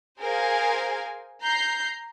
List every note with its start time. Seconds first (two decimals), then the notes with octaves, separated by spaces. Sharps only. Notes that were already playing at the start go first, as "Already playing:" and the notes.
0.21 G#4 A#4 C5 F5 G#5
1.43 A#5 G6 C7